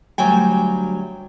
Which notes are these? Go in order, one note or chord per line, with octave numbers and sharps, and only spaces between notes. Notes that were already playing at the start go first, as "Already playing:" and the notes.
D2 F#3 G3 G5 G#5